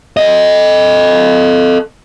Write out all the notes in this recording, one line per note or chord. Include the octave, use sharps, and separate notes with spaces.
A4 D#5